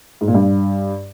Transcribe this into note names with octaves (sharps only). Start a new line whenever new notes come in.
G#2
A#2
G2